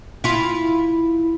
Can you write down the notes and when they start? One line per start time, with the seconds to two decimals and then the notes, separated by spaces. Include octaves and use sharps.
0.24 E4 F4